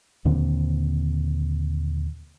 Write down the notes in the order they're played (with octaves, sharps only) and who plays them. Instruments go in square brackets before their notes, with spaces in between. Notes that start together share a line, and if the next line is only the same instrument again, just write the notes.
[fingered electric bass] D#2 A#2 D3 C4